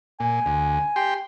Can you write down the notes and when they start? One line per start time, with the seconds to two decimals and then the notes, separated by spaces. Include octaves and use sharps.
0.20 A#2 G#5
0.46 D2
0.96 G4 G5 C6